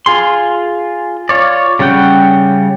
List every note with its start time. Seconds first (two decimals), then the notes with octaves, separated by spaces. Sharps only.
0.06 F4 G#4 C6
1.29 F4 C#5 D5
1.79 C#3 G3 C#4 F#5 G5